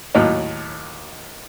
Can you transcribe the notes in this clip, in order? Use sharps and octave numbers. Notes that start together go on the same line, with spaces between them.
D#2 A2 F#3 D#4